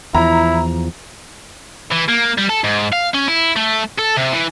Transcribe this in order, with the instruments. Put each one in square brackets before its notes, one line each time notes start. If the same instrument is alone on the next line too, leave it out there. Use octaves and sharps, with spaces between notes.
[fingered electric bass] E2 F3 [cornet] E4 [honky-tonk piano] A#5
[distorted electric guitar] E3
A#3
G3
A4
G#2
F5
C#4
E4
A3
A4
C3
E3